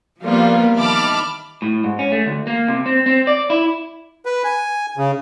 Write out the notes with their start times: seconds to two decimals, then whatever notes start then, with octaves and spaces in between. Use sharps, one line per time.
0.21 F3 G3 A#3 B3 F4
0.76 D#3 E5 A5 B5 D6 F6
1.62 A2
1.84 G#2
1.99 C#4
2.12 A3
2.26 D2
2.47 A#3
2.68 C3
2.86 C4
3.06 C4
3.27 D5
3.50 E4
4.25 B4
4.44 G#5
4.97 C#3